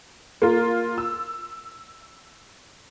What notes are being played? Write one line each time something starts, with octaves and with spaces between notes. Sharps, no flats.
A#3 F4
E6